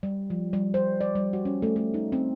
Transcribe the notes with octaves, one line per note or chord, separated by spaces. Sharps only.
G3
F3
G3
C5
D5
G3
F#4
C#4
A3
A3
D#4
C4